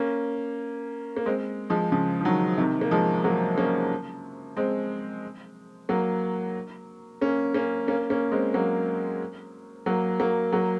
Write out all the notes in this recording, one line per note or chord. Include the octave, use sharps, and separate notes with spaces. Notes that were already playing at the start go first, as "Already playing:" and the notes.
Already playing: A#3 C#4
A#3
G#3 C4
F3 G#3
C#3 F3
F3
D#3 F#3
C3 D#3
A#3
F3 G#3
F#3 A#3
A#3 C#4
G#3 C4
F#3 A#3
A#3 C#4
A#3 C#4
A#3 C#4
A#3 C#4
G#3 C4
F#3 A#3
F#3 A#3
F#3 A#3
F#3 A#3